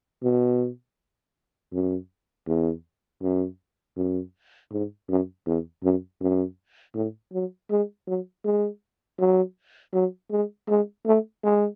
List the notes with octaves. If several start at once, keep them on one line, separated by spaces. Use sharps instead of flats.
B2
F#2
E2
F#2
F#2
G#2
F#2
E2
F#2
F#2
A2
F#3
G#3
F#3
G#3
F#3
F#3
G#3
G#3
A3
G#3